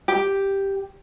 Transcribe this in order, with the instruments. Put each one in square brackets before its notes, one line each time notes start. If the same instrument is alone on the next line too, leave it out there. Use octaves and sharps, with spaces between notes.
[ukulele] G4